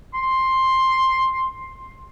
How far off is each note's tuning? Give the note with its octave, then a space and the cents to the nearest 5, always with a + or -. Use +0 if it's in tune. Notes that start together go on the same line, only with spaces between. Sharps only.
C6 +10